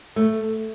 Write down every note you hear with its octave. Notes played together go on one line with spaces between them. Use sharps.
A3